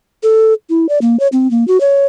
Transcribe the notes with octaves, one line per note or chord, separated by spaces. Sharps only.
A4
E4
D5
A#3
C#5
C4
A#3
F#4
C#5